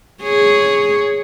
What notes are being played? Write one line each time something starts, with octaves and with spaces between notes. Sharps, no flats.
G#4 C#5